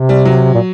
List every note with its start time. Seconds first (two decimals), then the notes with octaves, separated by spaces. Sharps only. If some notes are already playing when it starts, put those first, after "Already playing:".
Already playing: C3
0.09 G3
0.25 F#3
0.54 A#2